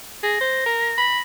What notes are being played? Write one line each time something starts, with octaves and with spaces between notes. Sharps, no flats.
G#4 A#6
C5
A#4
B5